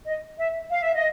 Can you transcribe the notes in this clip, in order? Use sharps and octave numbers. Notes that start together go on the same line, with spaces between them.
D#5
E5
F5
E5
D#5